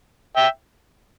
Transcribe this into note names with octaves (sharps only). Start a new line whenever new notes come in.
E5 G5